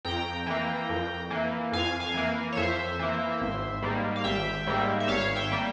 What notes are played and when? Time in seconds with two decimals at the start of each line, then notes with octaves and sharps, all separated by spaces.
0.05 F2 G5 A#5
0.46 E3 A#3
0.89 F2
1.30 E3 A#3
1.72 F2 F5 G#5
2.00 F5 G#5
2.14 E3 A#3
2.52 C#5
2.57 F2 C5 E5
2.99 E3 A#3
3.41 G#1
3.82 G#2 G3 A#3
4.16 F5
4.24 G#1 E5 G5
4.67 G#2 G3 A#3
5.00 E5
5.08 G#1 C#5 F5
5.36 E5 G5
5.52 G3 A#3